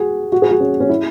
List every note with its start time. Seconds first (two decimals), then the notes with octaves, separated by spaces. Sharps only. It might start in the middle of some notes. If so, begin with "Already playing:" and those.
Already playing: F#4 G#4
0.32 F#4
0.42 G#4
0.51 F#4
0.60 C#4
0.80 C#4
0.89 E4